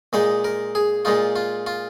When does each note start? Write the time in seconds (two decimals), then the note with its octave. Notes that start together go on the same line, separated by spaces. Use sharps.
0.13 A#2 G#3 D#4 D#5
0.44 A#4
0.75 G#4
1.05 A#2 G#3 D#4 F4
1.36 F4
1.67 F4